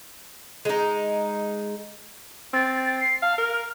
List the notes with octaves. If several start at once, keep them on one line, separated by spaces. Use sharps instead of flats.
G#3 D#4
C4 A6
A6
C7
F5 A5
A#4 F6